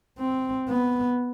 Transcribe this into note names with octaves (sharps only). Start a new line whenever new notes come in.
C4
B3